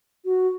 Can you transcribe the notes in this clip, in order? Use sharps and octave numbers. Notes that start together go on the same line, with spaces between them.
F#4